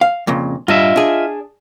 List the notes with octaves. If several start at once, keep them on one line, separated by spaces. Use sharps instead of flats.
F5
F2 A#2 C#3
G2 F4 D#5 E5
D4 G#4